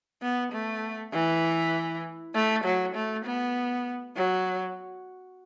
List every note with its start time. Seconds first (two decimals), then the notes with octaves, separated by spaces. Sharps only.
0.22 B3
0.52 A3
1.13 E3
2.34 A3
2.64 F#3
2.95 A3
3.25 B3
4.16 F#3